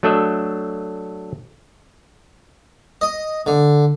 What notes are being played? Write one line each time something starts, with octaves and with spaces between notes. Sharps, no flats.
F#3 A3 D4 A4 D#5 E5
D#5
D3